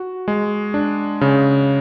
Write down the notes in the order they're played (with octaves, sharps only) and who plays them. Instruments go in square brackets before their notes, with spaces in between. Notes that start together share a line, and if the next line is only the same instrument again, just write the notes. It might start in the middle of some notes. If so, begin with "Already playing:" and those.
Already playing: [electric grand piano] F#4
G#3
D4
C#3